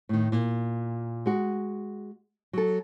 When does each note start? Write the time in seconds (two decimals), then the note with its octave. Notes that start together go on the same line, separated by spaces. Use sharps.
0.09 A2 D#3
0.32 A#2
1.26 G#3 F#4
2.53 F#3 A4